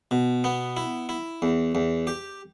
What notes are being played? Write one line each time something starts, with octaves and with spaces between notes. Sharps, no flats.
B2
B3
E4
E4
E2
E2
G4